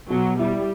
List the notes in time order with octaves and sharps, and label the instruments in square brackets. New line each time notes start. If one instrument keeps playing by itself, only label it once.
[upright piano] B2 [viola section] F#3
[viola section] G3 [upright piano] E4